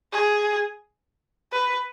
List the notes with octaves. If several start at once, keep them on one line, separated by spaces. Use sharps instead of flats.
G#4
B4